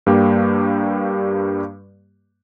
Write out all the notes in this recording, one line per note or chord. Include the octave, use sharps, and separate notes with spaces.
G2 G3 A#3 G4